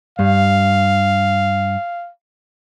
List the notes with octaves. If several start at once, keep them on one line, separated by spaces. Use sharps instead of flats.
G2 F5